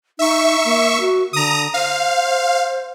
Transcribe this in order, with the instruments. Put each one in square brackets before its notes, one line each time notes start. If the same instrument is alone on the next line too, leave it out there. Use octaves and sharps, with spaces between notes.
[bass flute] D#4 [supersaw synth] E5 C#6
[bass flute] A#3
F#4
[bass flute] D3 [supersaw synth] A#5 D#6
[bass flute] C5 [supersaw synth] F5